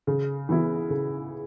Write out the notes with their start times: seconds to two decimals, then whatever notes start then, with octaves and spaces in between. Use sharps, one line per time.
0.07 C#3
0.49 E3 B3 E4
0.90 C#3